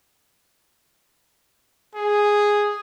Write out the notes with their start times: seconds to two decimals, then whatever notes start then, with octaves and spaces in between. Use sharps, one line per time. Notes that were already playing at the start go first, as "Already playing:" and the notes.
1.94 G#4